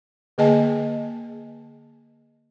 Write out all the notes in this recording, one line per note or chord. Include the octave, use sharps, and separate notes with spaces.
D3 A#3 G#4 D#5 G#5 A5